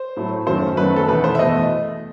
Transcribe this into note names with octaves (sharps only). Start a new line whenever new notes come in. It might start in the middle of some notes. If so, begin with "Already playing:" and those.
Already playing: C5
A2 F#3 A3
F#2 D#3 F#3 A3 C5
F#2 D#3 F#3 A3 B4
A4
E2 B2 A3 B4
C5
E5
E2 B2 A3 D#5